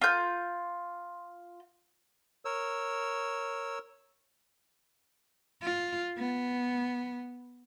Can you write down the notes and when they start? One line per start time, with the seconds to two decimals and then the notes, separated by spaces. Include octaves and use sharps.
0.01 F4 G6
2.45 A#4 C#5 E6
5.63 F4
6.18 B3